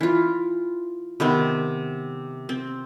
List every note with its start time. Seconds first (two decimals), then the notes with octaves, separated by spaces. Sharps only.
0.01 E3 F4
1.20 C3 D#3 B3 C4
2.49 C4